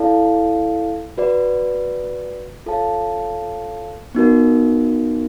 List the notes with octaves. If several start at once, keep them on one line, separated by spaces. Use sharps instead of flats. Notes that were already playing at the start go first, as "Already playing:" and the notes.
Already playing: E4 A4 D5 F5 A5
F#4 B4 D5
F4 A4 C#5 F5 A5
B3 D#4 F#4 A#4